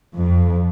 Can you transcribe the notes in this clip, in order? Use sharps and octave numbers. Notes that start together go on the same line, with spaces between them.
F2